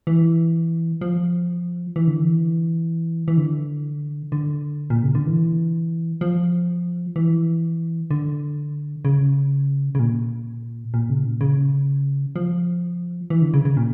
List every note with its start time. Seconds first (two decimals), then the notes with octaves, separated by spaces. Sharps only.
0.07 E3
1.01 F3
1.96 E3
2.07 D3
2.19 E3
3.28 E3
3.37 D3
4.32 D3
4.90 A#2
5.03 C#3
5.15 D3
5.27 E3
6.21 F3
7.16 E3
8.11 D3
9.05 C#3
9.95 C#3
9.99 A#2
10.94 A#2
11.10 C#3
11.25 A#2
11.41 C#3
12.36 F3
13.30 E3
13.42 D3
13.54 C#3
13.65 C#3
13.77 A#2